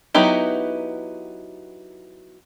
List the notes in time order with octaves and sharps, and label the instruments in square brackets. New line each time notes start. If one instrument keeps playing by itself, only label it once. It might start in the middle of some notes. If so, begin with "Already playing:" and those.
[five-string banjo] F#3 B3 D#4 E4 G4